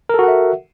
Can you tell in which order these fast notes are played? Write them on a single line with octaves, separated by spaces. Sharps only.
A#4 A4 F#4 F#5 E5